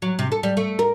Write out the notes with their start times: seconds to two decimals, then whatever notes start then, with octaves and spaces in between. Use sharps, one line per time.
0.02 F#3
0.19 C3
0.32 A4
0.43 G3
0.57 A3
0.79 A#4